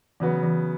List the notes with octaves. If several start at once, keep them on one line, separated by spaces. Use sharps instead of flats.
C#3 E3 F#3 B3 F#4
E3